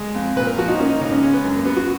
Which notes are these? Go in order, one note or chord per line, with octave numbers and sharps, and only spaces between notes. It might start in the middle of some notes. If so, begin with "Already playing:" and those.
Already playing: G#3
F2
A#2 B4
A#4
F3 F#4
D#4
A#3 C#4
D#4
C#2 D#4
C#4
G#3 C#4
B3
F#2
A#3
F#3 B3
F#4